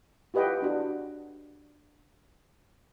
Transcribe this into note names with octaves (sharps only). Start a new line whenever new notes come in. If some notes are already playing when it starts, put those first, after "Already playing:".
F4 G4 B4 D#5 F#5 G5
D4 F#4